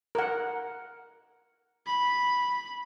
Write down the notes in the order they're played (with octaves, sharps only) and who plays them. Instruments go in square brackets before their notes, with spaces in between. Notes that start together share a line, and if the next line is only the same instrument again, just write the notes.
[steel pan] A#4 F#5
[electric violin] B5